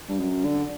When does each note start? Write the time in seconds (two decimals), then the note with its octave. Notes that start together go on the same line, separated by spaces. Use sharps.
0.09 G2
0.19 F#2
0.45 D3